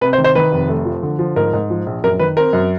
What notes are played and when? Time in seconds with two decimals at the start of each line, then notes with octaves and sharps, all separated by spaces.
0.01 C3 B4
0.13 C5
0.18 D#3
0.24 C5
0.35 D#3 B4
0.52 F1
0.69 A3
0.85 F3
1.03 D3
1.19 F3
1.36 G#2 A#4
1.53 G#2
1.70 F3
1.86 A#1
2.04 F#2 A#4
2.19 D#3 B4
2.37 C4 A#4
2.53 F#2